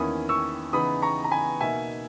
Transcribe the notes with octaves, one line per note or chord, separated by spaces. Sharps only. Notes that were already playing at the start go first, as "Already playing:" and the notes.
Already playing: E2 D#3 A#3 C#4 E4 B5 D#6
C#6 E6
C#3 E3 B3 D#4 B5 D#6
A#5 C#6
A#5
G#5 B5
B2 A#3 D#4 E5 G#5